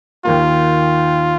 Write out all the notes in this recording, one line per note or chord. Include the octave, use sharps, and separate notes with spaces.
D#2 D#3 A#3 F4